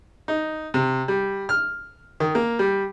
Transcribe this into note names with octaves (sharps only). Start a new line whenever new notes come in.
D#4
C3
G3
F6
D#3
A#3
G3